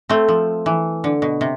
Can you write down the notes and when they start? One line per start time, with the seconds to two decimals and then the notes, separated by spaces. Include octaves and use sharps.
0.09 A3 C4
0.28 F3
0.66 E3
1.04 D3
1.22 B2
1.41 C3